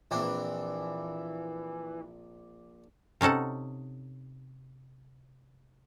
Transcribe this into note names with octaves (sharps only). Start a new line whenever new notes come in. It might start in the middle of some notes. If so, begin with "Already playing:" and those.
A#1 E3 C4 D4
C3 C#4 D#4 A4 F#5